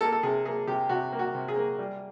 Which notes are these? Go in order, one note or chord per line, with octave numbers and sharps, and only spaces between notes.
A#3 A4
A4
C3 G#4
A#3 G#4
C3 G4
C3 F#4
A#3
F#4
C3
G#4
A#3
G3